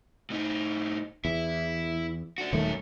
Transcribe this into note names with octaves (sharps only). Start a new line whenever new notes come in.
A2 D#4
E2 E4
D4 F#4
D#1 F#2 D#3 A3 C#5